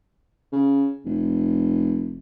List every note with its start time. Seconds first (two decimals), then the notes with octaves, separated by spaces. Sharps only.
0.52 C#3
1.06 F1